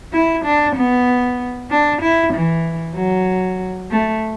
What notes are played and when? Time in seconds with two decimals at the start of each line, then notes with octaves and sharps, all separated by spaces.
0.13 E4
0.44 D4
0.75 B3
1.70 D4
2.02 E4
2.33 E3
2.96 F#3
3.91 A3